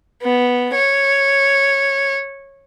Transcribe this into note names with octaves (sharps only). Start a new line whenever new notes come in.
B3
C#5